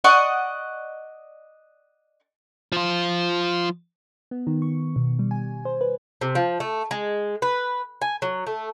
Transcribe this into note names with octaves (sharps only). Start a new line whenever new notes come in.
D5 D#5 F#5 C#6
F3 F4
B3
D#3
C#6
B2
G3
G#5
C5
B4
C3
F3
A3
G#3
B4
G#5
F#3
A3